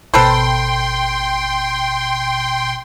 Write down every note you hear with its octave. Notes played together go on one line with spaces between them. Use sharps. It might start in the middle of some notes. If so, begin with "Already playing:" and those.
G#1 B2 A4 B4 C5 G5 C6